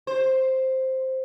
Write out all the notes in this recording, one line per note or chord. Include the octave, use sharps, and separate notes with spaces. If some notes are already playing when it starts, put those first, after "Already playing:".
C5